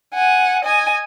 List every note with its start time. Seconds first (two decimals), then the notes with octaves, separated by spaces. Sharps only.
0.14 F#5 G#5
0.65 D#5 G#5